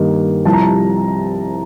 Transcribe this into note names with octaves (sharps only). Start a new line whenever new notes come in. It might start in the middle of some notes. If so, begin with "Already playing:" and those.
Already playing: G2 D#3 A#3
C2 C3 F3 A5
A#5
A5